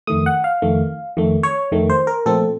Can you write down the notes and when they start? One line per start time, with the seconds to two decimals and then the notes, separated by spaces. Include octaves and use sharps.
0.07 F2 D#3 A3 D#6
0.26 F#5
0.44 F5
0.62 F2 D#3 A3
1.17 F2 D#3 A3
1.43 C#5
1.71 F2 D#3 A3
1.90 C5
2.07 A#4
2.26 A#2 F3 A3 C4 A4